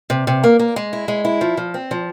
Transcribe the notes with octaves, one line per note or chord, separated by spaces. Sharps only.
C3
C3
A#3
A#3
G#3
E4
G#3
E4
F3
F3
C4
F3